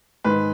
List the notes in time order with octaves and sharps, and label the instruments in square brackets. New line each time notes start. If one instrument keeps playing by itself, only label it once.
[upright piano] G#2 D#3 G#3 B4